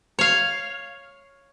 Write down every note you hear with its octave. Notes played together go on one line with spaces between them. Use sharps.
C#5 F5